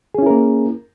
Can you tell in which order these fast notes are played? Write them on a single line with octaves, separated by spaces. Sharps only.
G#4 C#4 E4 A#4 A#3